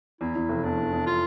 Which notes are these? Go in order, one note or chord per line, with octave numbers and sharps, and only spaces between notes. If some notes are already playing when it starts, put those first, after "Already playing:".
E2 E4
E2
F1
E2 D4
E2
E2
F4